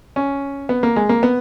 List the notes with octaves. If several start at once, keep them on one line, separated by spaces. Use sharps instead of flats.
C#4
B3
A#3
G#3
A#3
B3